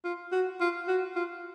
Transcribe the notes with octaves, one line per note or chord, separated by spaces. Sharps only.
F4
F#4
F4
F#4
F4